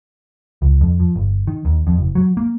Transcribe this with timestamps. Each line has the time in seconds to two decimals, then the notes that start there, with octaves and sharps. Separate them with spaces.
0.62 C#2
0.81 F2
1.00 F3
1.16 G1
1.47 D#3
1.65 D#2
1.87 F2
1.98 F#1
2.15 F#3
2.37 A#3